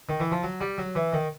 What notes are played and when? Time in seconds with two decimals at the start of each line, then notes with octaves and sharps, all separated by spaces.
0.09 D#3
0.20 E3
0.31 F3
0.43 F#3
0.61 G3
0.78 F#3
0.95 E3
1.13 D#3